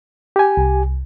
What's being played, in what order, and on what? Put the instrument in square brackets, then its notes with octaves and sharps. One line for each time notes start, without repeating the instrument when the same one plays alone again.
[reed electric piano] G4 G#5
[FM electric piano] C2